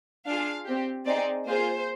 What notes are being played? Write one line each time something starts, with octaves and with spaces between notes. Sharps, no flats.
D4 F4 G#4 F5
C4 G4
C4 D#4 G#4 D5
A#3 F4 G#4 C5